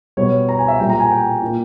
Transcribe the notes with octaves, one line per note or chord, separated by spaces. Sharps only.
B2 G3 B3 C#5
A#5
G#5
E5
A#2 G3 A#3 G5
A#5
G#5
G5
A#2 A#3